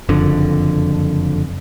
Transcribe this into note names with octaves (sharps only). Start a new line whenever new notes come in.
F#1 F2 D3